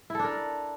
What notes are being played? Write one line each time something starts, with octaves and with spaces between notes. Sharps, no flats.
D4 E4 A4 A#4